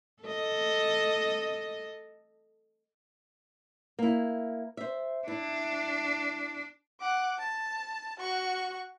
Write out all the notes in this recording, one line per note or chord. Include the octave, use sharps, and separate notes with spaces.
A4 D#5
A#3 E4
C5 E5
D4 E4
F#5 D6
A5
F#4 C#6